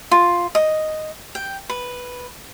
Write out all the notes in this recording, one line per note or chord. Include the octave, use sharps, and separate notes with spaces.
F4
D#5
G5
B4